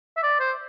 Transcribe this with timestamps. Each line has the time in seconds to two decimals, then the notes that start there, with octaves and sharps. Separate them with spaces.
0.17 E5
0.23 D5
0.40 C5